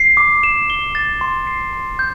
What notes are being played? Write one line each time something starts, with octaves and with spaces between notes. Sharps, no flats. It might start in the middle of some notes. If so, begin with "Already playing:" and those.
Already playing: C7
D6
E7
G7
A6
C6
C7
C6
G6